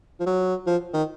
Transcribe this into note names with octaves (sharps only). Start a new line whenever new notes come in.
F3
F#3
F3
D#3